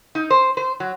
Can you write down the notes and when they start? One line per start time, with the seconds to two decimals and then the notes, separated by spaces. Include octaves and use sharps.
0.15 D#4
0.30 C5
0.57 C5
0.80 F#3